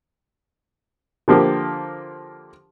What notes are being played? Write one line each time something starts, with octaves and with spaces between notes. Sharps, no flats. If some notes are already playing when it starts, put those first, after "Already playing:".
D3 F3 A#3 G4